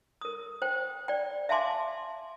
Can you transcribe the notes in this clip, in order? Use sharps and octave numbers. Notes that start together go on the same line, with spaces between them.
A#4 D#6
C5 G5
D5 G5
E5 F5 G#5 A5 C6 D6